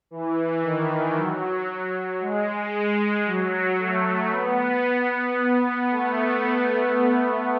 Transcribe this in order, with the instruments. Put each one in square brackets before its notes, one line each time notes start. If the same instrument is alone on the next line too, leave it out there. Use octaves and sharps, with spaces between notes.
[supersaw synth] E3
D#3
F#3
G#3
G#3
F#3
A3
B3
A3